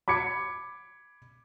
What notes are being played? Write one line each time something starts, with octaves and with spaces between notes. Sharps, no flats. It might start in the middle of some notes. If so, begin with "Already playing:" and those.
B5 D6 G#6 C#7